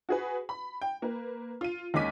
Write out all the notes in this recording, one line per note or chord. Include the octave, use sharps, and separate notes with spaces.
F#4 G#4 B4
B5
G5
A#3 B4
F4 D#7
D#2 G#3 C#4 D6 B6 D#7